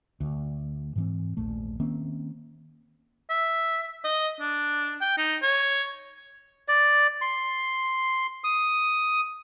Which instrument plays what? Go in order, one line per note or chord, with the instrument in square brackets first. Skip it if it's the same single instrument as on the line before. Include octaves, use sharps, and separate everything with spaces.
[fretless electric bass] D2
G#2 E3 C4
D#1 A#1 A3
D#3 A#3 C4 C#4
[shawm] E5
D#5
D4
G5
D#4
C#5
[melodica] D5
C6
D#6